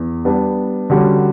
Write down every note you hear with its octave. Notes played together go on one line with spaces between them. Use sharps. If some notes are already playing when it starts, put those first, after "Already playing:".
Already playing: E2
G3 B3 D4
D3 G3 C#4 F#4